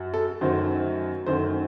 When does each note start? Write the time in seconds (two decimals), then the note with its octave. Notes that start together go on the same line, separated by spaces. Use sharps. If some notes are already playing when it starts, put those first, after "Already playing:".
Already playing: F#2
0.14 A4
0.41 F#2 D#3 F#3 A3 C5
1.26 F#2 D#3 F#3 A3 C5